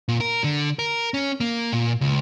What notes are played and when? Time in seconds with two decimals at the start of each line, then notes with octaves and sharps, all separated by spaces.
0.08 A#2
0.20 A#4
0.44 D3
0.79 A#4
1.14 C#4
1.40 A#3
1.73 A#2
2.01 C#2